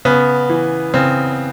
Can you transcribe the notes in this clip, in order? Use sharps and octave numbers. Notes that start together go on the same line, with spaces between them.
C#3 B3
E3
C#3 C4